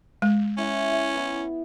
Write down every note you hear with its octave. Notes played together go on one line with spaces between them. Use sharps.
G#3
C#4 E4 E5 F#5
E5 B5
B3 E4